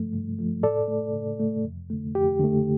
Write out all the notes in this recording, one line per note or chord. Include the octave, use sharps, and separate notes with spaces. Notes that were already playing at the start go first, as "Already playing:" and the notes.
Already playing: G2 F3 A3
G2
F3 A3
A2 A4 D5
A3
A2
A3
F2
D3 A3
F2 G4
D3 A3